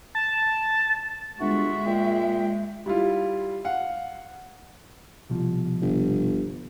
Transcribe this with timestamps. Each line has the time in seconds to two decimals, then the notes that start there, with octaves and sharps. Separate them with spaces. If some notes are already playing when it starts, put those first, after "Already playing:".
0.15 A5
1.40 G1 G#3 F#4 E5
1.87 A#2 G5
2.86 G3 E4 F4
3.65 F5 F#5
5.30 C2 B2 F3
5.81 G1